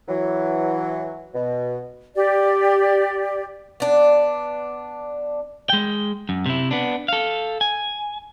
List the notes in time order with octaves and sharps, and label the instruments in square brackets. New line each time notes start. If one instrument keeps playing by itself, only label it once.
[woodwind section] E3 F#3
B2
[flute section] G4 D5
[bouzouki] B3 D4
[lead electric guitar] G#3 G5
F#2
C3 E4
B3 D4
A4 F5
G#5